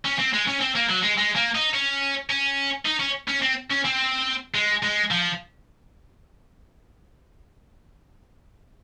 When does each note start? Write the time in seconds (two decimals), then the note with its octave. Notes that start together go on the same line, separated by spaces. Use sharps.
0.05 C#4
0.19 C4
0.33 G#3
0.48 C#4
0.61 C4
0.75 A#3
0.89 F#3
1.03 G#3
1.18 G#3
1.36 A#3
1.55 D#4
1.74 C#4
2.30 C#4
2.86 D#4
3.00 C#4
3.28 C#4
3.42 C4
3.71 C#4
3.85 C4
4.55 G#3
4.83 G#3
5.11 F3